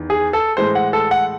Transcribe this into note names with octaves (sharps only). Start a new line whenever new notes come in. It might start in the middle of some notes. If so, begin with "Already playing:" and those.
Already playing: E2 D#3
G#4
A4
A2 E3 G#3 C5
F#5
A4
F#5